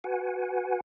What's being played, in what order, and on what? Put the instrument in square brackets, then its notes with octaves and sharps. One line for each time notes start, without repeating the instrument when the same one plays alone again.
[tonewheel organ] F#4 B4 F#5 G#5